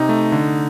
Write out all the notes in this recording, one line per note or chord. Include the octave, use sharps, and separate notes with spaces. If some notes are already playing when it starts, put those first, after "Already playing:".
Already playing: C3 D#4
A3
D3